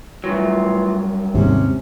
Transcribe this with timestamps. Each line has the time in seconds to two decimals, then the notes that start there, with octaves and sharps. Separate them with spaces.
0.24 G2 E3 F#3 A3 F4
1.34 D#2 G#2 C3 C#4